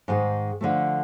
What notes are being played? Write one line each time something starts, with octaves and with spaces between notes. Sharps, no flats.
G#2 D#3 G#3
D3 F3 A3